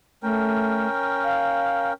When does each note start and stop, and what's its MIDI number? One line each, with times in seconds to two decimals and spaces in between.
0.23 0.88 57
0.23 1.93 61
0.23 1.93 70
0.23 1.93 79
1.24 1.91 77